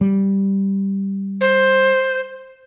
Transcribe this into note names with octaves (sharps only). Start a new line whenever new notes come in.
G3
C5